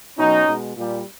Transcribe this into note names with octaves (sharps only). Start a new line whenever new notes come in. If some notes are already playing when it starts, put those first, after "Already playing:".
B2 F#3 C#4 D#4
B2 G#3
A#2 G3